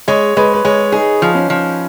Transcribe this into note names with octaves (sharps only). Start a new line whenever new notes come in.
G#3 C#5
G#3 B4
B4
G#3 C#5
D#4 G#4
F3
C#4
F3